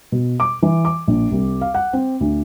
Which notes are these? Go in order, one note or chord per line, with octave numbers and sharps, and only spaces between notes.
B2
D6
E3
D6
A#1
C2
F5
F#5
C4
D2